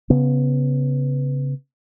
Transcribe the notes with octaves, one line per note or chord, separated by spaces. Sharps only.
C#3 B3